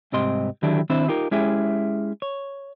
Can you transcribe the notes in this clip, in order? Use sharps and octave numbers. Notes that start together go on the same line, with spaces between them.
C2 G#2 C4 G4 D#5 C6
D3 D#3 F#3 D4 E4 G4
D#3 C4 D4 E4 C5
D#4 F4 G4 A#4
G#3 C#4 E4 G4 G#4 E5
C#5